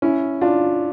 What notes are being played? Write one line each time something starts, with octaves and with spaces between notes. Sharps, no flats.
C#4 E4
D4 F4